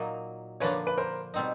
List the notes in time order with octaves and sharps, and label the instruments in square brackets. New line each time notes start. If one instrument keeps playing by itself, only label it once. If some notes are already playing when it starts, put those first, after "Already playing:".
Already playing: [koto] A#2 F#3 A#3 D#4
[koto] D3 F3 A#3 D4 [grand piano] B4 C#5
[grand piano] B4
A#4 C5
[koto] B2 G3 C4 D#4